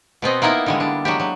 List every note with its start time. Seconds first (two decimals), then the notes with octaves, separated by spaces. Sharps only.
0.22 B2 B3 C4 D#5
0.42 A#3 B3 D#4 E4 A#4
0.66 D3 G3 G#3
0.80 D4
1.05 F#3 G#3 G4
1.20 F#3